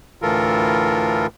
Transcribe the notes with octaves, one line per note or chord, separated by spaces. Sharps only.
D2 A2 E3 F4 A4 A#4